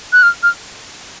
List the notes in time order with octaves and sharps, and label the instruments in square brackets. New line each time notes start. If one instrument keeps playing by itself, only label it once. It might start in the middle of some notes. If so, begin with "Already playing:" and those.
[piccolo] F#6
F6
F6